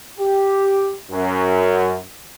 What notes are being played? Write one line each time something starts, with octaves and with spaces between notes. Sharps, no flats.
G4
F#2